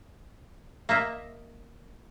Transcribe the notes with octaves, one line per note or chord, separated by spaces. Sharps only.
A#3 D#5 E5